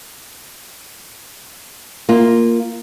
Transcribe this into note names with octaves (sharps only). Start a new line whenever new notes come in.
A#3 F4